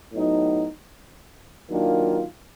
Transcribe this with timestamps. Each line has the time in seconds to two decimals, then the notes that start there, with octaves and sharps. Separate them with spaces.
0.13 A2 F#3 B3 D#4
1.70 D#3 F#3 A#3 D4 F4